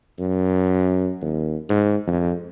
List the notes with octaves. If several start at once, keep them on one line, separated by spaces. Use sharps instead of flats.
F#2
D#2
G#2
F2